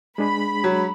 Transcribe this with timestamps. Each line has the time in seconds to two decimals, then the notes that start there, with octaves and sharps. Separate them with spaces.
0.18 G#3 D4 G#4 B5
0.64 F#3